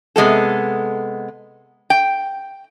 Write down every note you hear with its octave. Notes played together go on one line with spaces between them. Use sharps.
C3 G#3 B3 A4
G5